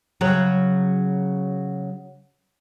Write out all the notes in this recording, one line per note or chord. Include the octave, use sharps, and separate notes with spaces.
C#3 F#3